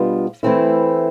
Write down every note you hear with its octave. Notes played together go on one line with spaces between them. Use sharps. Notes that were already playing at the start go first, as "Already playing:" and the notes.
Already playing: B2 G3 B3 D4 F4
E3 A3 C4 E4